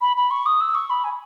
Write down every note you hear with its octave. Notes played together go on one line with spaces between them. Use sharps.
B5
B5
C#6
D#6
E6
C#6
B5
G#5